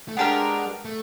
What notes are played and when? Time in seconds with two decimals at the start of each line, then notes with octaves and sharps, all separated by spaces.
0.08 A3
0.17 G#3 B3 D4 G4 A#4
0.85 A3